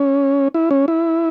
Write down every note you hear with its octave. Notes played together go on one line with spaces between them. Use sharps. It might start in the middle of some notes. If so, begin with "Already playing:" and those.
Already playing: C#4
E4
C#4
E4